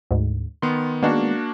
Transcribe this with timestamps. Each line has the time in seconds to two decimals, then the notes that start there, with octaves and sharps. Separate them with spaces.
0.11 D2 G#2
0.62 D#3 B3 C6
1.03 D#3 G#3 A#3 B3 D4 F#4